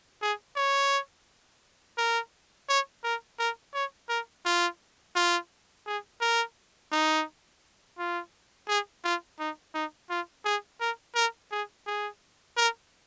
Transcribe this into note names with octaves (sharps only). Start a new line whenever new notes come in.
G#4
C#5
A#4
C#5
A#4
A#4
C#5
A#4
F4
F4
G#4
A#4
D#4
F4
G#4
F4
D#4
D#4
F4
G#4
A#4
A#4
G#4
G#4
A#4